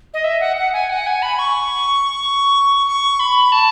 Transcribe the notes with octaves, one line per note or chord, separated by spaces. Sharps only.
D#5
E5
F#5
F#5
G#5
F#5
G#5
B5
C#6
C#6
B5
A5